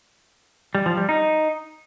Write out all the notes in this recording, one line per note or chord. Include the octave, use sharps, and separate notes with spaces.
G3
F3
G3
D#4